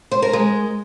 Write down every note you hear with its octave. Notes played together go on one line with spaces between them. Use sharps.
C5
A#4
G#3